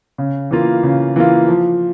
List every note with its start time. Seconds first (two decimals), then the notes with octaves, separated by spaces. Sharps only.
0.18 C#3
0.51 E3 A#3 F4
0.83 C#3
1.16 E3 A#3 F4
1.48 F3